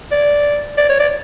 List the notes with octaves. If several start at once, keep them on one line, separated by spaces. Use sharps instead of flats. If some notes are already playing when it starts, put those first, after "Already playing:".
D5
D5
C#5
D5